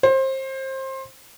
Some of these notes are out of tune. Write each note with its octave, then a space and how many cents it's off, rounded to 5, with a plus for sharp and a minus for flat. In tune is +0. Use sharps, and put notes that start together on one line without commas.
C5 +25